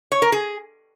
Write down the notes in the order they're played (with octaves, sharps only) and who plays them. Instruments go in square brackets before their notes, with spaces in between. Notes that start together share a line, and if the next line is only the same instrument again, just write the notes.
[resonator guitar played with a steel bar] C#5
A#4
G#4